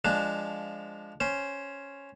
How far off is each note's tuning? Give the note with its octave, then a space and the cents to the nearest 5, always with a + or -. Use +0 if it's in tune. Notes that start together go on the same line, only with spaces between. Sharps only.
F3 +0 G#3 -10 D4 +0
C#4 +0 C5 +0